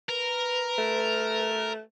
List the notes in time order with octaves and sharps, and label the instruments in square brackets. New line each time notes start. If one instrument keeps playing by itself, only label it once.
[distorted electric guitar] A#4 [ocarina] B4
[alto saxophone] A3